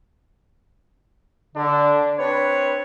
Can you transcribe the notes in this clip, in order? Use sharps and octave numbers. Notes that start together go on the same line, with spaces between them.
D3 D4
C4 D4 B4 C#5